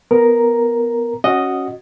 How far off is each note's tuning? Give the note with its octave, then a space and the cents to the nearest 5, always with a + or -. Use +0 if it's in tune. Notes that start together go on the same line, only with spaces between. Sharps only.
B3 +0 A#4 +0 A#5 +5
C#4 -10 F#4 +0 D#5 +0